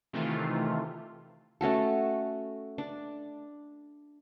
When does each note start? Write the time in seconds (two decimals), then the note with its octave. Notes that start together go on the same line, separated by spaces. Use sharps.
0.13 C3 D#3 E3 A3 F4
1.61 A3 C#4 F#4 A4
2.78 D4